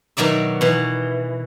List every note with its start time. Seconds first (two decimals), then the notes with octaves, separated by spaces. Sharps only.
0.17 B2 D#3 F#3 D5 E5
0.61 B2 E3